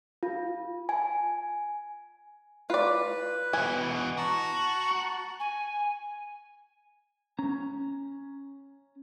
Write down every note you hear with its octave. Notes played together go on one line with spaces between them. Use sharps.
F4
G#5
F4 B4 D5
B2 E3 G#5
F#4 A5 A#5
G#5
C#4 A#5